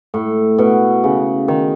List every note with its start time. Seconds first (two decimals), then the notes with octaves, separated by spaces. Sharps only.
0.14 A2
0.58 B2
1.04 C#3
1.48 D#3